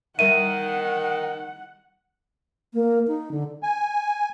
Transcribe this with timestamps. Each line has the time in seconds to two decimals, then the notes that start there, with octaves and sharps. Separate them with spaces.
0.19 D#3 G3 A#4 E5 F#5 D#7
2.74 A#3
3.07 D#4
3.31 D3
3.63 G#5